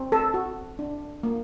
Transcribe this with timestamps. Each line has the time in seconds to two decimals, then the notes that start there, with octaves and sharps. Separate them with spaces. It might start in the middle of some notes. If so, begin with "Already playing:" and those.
Already playing: C4
0.12 A4
0.34 F#4
0.79 D4
1.23 A#3